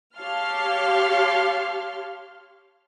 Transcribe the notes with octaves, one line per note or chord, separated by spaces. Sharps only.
G4 C#5 F5 A5 C6 F6